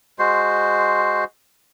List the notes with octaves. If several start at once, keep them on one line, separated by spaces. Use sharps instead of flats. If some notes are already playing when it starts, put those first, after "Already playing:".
G#3 F#4 C5 C6